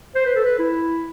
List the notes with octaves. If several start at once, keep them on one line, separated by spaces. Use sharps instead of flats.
C5
B4
A4
B4
E4